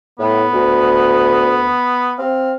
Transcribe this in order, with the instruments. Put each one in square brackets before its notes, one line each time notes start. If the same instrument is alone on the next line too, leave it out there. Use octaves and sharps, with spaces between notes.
[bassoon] A2 [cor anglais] B3
[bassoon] D2
[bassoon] C4 [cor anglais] F5